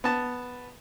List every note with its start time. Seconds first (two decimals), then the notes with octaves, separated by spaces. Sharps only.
0.04 B3 A5